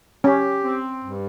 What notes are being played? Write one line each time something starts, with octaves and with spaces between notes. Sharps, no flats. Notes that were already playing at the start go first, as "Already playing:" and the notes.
C#4 G4
C4
G2